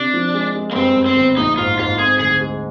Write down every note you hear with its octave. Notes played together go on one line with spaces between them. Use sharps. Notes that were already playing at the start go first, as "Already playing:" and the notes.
Already playing: C3 D4
F3
G#3
G#3
A#3
G2 C4
G2
C4
G1
A#1 D#4
G#2 F4
G#2 F4
C4 G#4
D2 G#4
G#3